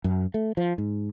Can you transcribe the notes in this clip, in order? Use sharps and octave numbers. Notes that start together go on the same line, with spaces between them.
F#2
A3
F3
G#2